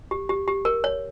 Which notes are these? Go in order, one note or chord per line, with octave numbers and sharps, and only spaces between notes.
G4
G4
G4
A#4
C#5